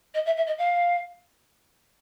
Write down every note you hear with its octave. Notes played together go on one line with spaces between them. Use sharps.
D#5
E5
E5
D#5
F5